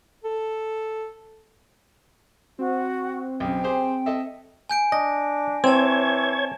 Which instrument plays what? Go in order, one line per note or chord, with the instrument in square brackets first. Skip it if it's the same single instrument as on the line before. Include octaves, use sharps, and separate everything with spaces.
[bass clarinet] A4
[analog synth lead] C4 [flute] F#4
[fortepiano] B1 C#3 [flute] G5
[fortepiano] G4 G#4 C5
A4 D#5 E5
[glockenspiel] G#5 G6 D7
[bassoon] D4 [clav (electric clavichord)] D#5 [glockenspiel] A#6
[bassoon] E3 [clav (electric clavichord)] C4 [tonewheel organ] C#5 G#6 [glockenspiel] A5 E7